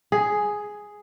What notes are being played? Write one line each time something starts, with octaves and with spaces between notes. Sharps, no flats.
G#4